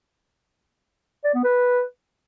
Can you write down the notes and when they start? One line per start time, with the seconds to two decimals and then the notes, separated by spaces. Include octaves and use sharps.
1.24 D5
1.34 B3
1.44 B4